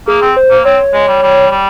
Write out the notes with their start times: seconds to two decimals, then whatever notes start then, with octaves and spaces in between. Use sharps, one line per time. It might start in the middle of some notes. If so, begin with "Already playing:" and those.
0.08 A#3 G#4
0.22 C4
0.37 C5
0.50 A#3
0.65 C4 C#5
0.94 G#3
1.08 G3
1.23 G3
1.51 G3